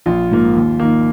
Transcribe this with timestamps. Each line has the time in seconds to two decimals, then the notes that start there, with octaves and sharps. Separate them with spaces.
0.06 A#1 F4
0.31 G#2 F3 A#3
0.55 D#2
0.80 D#3 A#3